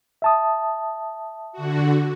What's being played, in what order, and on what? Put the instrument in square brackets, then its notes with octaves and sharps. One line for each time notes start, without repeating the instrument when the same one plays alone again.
[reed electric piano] E5 A5 D#6
[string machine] D3 F#4